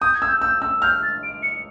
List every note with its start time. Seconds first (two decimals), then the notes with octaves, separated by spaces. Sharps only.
0.01 D#6 G6
0.14 G#6
0.22 E6
0.27 G6
0.42 E6 G6
0.62 E6
0.82 F6 G6
1.03 A6
1.23 D7
1.43 C#7